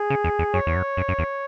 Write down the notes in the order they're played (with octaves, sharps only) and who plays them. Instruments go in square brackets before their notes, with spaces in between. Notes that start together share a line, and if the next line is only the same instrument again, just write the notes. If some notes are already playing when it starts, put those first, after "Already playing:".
Already playing: [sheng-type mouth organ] G#4
[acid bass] C#3
E2
E2
[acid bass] F#2 [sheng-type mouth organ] C#5
[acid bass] E2
F#2
F#2
F#2
E2